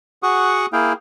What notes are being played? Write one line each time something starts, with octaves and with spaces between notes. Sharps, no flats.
F#4 G#4 F#5 C#6 D#6
A#3 E4 G#4 F5 G5